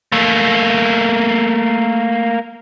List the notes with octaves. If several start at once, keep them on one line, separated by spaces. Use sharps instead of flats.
A3 A#3